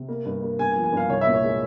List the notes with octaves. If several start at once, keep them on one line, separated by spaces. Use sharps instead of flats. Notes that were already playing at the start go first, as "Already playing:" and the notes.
Already playing: C3
A#3
G2
A#3
G2 G#5
G#5
F3
G#5
G2 F5
C2 C#5
E5
A#2
C#5
G#3